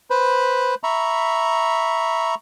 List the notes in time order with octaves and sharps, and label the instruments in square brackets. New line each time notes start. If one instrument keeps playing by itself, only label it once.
[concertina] B4 C5 B5
E5 A#5 B5 C#6